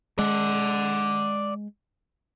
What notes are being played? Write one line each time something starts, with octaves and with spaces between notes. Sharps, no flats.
G#3 D5 F#5